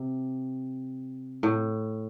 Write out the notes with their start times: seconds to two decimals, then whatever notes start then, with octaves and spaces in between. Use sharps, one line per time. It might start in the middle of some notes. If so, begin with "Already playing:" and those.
Already playing: C3
1.43 A2